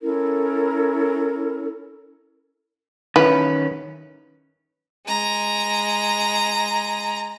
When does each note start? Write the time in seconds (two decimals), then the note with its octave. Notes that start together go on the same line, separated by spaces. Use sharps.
0.01 C#4 E4 A4 A#4
3.16 D#3 E3 C#4 B4
5.07 G#3 A#5